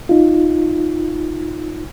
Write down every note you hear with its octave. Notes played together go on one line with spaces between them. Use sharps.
D#4 F4